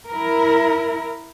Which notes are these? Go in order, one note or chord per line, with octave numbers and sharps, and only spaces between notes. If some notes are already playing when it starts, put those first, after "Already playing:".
E4 A#4